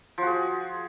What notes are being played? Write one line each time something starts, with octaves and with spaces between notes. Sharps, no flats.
F3 F#4 G#4